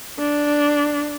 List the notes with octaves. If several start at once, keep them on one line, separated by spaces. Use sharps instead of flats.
D4